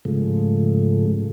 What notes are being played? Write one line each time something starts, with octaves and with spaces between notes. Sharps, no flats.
G#2 C#3 F3 G#3 A3